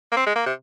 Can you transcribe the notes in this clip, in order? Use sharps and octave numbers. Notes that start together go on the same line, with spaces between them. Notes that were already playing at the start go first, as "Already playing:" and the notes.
A#3
C4
G#3
A#3
C3